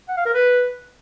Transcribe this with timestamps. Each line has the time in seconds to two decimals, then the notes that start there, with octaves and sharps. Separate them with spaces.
0.09 F#5
0.17 F5
0.26 A#4
0.34 B4